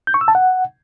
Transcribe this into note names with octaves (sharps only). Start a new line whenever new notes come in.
G6
C#6
E6
A5
F#5